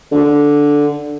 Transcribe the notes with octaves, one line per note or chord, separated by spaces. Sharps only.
D3